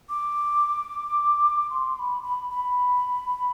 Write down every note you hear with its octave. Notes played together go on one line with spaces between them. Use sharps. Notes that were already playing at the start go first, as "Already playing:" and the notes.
D6
C6
C6
B5
B5
B5